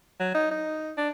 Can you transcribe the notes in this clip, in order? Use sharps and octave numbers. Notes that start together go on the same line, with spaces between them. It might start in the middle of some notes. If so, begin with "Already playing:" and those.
F#3
D#4
D#4
D4